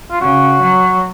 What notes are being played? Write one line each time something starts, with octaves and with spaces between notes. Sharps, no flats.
F4
C#3 F#4
F#3